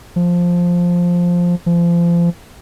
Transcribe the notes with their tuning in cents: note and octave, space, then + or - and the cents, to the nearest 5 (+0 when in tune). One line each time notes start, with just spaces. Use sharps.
F3 +5
F3 -30